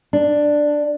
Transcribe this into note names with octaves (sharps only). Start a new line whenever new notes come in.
D4